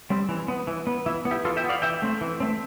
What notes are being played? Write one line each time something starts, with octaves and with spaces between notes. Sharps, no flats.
G3 C4
E3
B3
E3
B3
E3 E4
B3
E4 G4
E3 F4 A4
E5 G5
B3
D5 F5
E3 E5 G5
A3 C4
E3
A3 C4